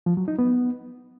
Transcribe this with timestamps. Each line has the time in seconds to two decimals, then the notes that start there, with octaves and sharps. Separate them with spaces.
0.06 F3
0.17 F#3
0.28 D#4
0.39 B3